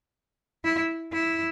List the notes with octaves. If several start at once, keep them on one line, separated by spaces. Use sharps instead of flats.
E4
E4